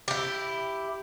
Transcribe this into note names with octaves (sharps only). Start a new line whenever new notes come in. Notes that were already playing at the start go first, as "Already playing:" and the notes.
E4 G4